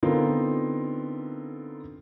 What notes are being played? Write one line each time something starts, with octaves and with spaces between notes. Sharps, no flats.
D3 B3 C4 D#4 F4 A#4